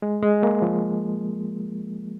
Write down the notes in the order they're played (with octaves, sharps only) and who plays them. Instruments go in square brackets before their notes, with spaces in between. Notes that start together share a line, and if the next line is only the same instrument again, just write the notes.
[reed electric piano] G#3
G#3
A#3
F3